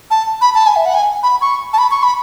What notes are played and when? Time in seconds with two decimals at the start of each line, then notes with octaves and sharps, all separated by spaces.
0.11 A5
0.41 B5
0.54 A5
0.67 G#5
0.76 E5
0.86 F#5
0.94 G#5
1.23 B5
1.41 C#6
1.73 A5
1.78 B5
1.91 C#6
2.03 B5